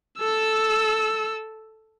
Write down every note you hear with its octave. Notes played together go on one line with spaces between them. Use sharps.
A4 E6